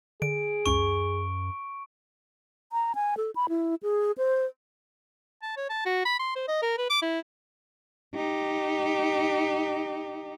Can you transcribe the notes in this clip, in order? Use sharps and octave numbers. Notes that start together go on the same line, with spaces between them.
D3 G#4 D7
C#2 F#2 C#4 C#6 D7
A#5
G#5
A4
B5
E4
G#4
C5
A5
C#5
A5
F#4
B5
C6
C5
D#5
A#4
B4
D6
E4
D#4 G4